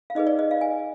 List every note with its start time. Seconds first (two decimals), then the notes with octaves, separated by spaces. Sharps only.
0.10 F5
0.15 D#4 G#4 B4 D#5
0.27 D5
0.39 D#5
0.51 F5
0.61 G#5